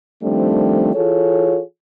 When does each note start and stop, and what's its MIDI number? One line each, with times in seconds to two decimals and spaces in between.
0.23 0.95 51
0.23 0.95 53
0.23 0.95 55
0.23 0.95 57
0.23 0.95 60
0.23 0.95 62
0.95 1.61 52
0.95 1.61 65
0.95 1.61 68
0.95 1.61 69
0.95 1.61 73